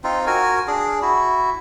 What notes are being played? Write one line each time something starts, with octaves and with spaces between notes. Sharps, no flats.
C4 D#4 F4
F#4 A#4 G#5
D4 G#4
E4 F#4